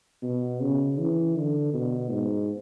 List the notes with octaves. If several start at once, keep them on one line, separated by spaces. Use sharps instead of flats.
B2
C#3
E3
D3
B2
G#2